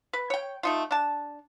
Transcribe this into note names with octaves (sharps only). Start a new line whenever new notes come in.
B4
C#5 G5
A3 D#4 F4
D4 A5